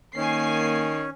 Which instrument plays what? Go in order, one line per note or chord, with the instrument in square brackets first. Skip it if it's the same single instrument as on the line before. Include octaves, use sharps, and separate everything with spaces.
[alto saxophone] D#3 [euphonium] A#3 [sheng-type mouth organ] C#4 [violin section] G#5 C7